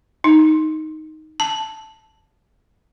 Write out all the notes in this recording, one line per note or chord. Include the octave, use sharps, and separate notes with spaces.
D#4
A5